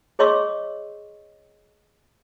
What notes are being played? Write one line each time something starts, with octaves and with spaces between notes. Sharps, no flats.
G#4 C#5 D#5 C6 C#6 E6